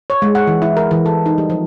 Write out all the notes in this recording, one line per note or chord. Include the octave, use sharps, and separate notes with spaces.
C#5
G#3
F#5
E3
E4
A#4
E3
A4
D#4
G3
F3